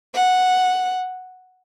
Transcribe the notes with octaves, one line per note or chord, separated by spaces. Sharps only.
F#5